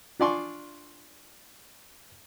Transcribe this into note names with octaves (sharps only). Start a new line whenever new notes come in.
D4 F4 D5 G#5 C6 C#6